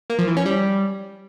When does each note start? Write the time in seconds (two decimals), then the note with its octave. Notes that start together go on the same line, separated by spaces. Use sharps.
0.10 A#3
0.19 F3
0.28 E3
0.37 C#4
0.46 G3